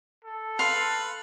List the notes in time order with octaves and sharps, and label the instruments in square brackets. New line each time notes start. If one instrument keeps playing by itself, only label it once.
[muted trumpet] A4
[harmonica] B4 [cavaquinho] F5 C6